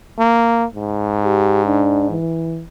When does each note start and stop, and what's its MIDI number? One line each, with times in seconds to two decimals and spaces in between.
0.19 0.65 58
0.75 2.15 44
1.24 1.64 67
1.66 2.10 62
2.10 2.64 52